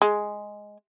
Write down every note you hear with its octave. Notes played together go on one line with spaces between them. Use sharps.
G#3